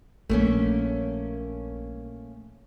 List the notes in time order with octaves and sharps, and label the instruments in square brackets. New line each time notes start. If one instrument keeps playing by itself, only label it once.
[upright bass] A#1 G3 [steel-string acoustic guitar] A3 A#3 C#4